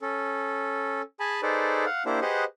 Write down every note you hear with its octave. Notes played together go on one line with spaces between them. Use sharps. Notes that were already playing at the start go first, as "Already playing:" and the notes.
C#4 A4
G#4 G#5 A5 B5
D#4 G#4 A4 B4 C5 D5
F5 F#5
A#3 D4 E4 G4 C5
G4 G#4 B4 C5 D#5 F#5